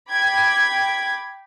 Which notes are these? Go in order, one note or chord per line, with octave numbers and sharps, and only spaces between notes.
G5 B5 D6 G#6